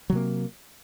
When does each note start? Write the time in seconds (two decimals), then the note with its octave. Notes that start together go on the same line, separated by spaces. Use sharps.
0.10 F#3
0.12 C3
0.15 A#3